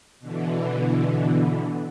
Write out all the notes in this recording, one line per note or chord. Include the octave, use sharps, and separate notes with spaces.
B2 D3 E3